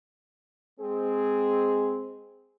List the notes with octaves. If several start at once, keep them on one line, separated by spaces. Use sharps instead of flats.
G#3 C4 G#4